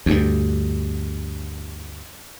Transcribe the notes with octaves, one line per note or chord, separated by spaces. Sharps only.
D2 G2